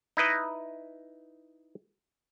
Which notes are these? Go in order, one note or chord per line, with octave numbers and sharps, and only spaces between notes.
D#4 E4 B4 D#5